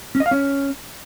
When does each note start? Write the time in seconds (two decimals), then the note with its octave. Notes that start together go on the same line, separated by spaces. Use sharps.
0.15 C#4
0.20 D#5
0.26 F5
0.31 C#4